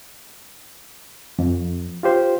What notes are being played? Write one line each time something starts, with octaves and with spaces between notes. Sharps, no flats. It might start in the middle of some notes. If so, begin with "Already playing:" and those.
F2
F4 G4 C5